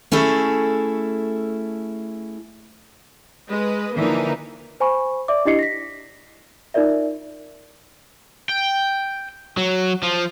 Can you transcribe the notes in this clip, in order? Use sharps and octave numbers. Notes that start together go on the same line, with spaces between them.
A3 C#4 E4 G#4 A4
G#3 B4 D#5
D3 E3 F3 A#3 D4 D#4
C5 G#5 B5 C#6
D5 E5 D6
D4 E4 G4 D#5 C7 C#7
A#6 B6
D#4 F4 A#4 D5 E5
G5
F#3
F3